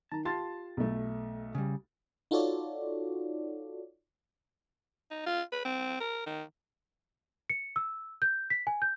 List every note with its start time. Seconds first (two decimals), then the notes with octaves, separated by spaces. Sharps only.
0.12 D#3 A5 A#5
0.25 F4 G4 A5 C6 A6
0.77 B1 A3
1.55 C#3 G3
2.31 D#4 F4 F#4 A4 C#5 D5
5.11 D#4
5.26 F4
5.52 B4
5.65 C4
6.00 A#4
6.26 D#3
7.50 C#7
7.76 E6
8.22 G6
8.50 B6
8.67 G#5
8.82 G6